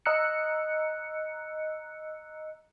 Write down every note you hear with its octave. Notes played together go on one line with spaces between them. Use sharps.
D#5 A#5 E6 F#6 C#7